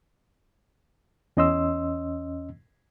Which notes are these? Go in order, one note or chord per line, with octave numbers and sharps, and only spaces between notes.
E2 C#4 D#5 C6 E6